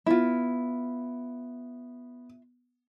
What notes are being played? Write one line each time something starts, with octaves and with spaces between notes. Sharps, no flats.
B3 E4 F4